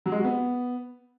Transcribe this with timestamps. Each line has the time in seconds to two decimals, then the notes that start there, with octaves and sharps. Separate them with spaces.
0.06 F#3
0.12 G#3
0.18 F#4
0.24 B3